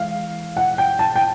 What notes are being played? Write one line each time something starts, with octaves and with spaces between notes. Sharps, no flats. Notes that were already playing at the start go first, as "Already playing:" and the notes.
Already playing: E3 G#3 F5
F#5
G5
A5
G5